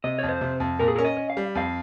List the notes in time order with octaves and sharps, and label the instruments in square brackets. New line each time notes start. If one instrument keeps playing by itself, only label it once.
[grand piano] C3 [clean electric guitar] D#5
[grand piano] F2 [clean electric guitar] C#5
[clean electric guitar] C5
[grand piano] C3
F2
[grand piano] A#2 [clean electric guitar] A#4
[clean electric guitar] G#4
[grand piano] C#4 [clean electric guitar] A#4
[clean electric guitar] D#5
[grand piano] C#4
[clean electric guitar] F5
[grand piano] G3
[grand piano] F2 [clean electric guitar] F5